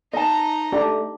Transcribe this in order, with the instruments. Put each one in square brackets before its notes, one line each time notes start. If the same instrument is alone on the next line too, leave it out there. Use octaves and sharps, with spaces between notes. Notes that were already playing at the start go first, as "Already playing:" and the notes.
[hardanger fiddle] D#4 A#5 [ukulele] D#5 A5
[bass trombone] A3 [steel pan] D4 G4